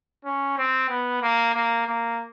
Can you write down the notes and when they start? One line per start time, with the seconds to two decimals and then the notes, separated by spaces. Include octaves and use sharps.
0.25 C#4
0.58 C4
0.89 B3
1.22 A#3
1.55 A#3
1.87 A#3